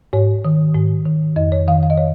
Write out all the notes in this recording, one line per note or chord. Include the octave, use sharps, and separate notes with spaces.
G#2 C#5
D#3
G#2
D#3
F2 D#5
C#5
D#3 F5
F5
D#5
C#5